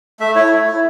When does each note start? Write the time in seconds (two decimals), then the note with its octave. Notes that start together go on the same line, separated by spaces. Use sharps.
0.20 A3 E5
0.35 E4 C#5
0.51 A3
0.67 E4